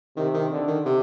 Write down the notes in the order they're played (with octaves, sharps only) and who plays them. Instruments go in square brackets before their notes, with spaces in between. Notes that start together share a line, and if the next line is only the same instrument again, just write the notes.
[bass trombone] C3 [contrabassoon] D#3
[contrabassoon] D#3
[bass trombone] D3
[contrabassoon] D#3
C3